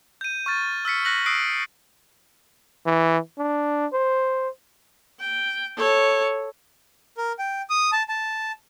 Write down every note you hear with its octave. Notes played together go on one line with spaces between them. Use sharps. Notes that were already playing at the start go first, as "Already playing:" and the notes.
G6 D#7
C#6 F6 A6
E6 F6 B6 C#7
F#6 A#6 B6 F#7
D#6 E6 F#6 C7 D7
E3
D4
C5
G5
A4 C#5
A#4
G5
D#6
A5
A5